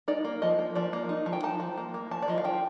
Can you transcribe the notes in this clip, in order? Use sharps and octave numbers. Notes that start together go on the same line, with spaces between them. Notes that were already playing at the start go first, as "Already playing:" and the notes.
D#4 D5
A#3
F3 D#5
A#3
F3 D5
A#3
D#4
F3
G5
D#4 A5
F3
A#3
A#3
F3 A5
D5
F3 D#5
F5
F3 G5